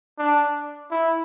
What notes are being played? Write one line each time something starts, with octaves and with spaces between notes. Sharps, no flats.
D4
E4